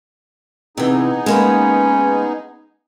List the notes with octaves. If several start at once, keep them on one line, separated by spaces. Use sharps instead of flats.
C3 E3 B3 D#4 G#4
G#3 A#3 C#4 B4